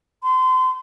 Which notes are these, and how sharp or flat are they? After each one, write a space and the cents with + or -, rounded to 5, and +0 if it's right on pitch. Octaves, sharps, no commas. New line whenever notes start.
C6 -30